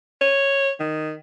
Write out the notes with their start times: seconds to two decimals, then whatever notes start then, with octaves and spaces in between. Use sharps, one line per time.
0.21 C#5
0.80 D#3